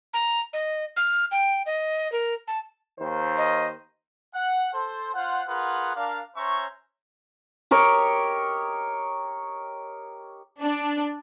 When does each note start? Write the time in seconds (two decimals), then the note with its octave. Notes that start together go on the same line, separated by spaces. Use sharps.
0.14 A#5
0.53 D#5
0.97 F6
1.32 G5
1.66 D#5
2.12 A#4
2.48 A5
3.00 D#2 D#3 C5
3.38 D#5
4.35 F#5
4.74 A4 C5
5.15 F4 C5 F5 F#5
5.49 F4 G#4 A#4 B4 F#5
5.96 D4 A#4 F5
6.37 C#4 C5 C#5 E5 A#5 C#6
7.71 G4 A#4 C#5 D#5
10.62 D4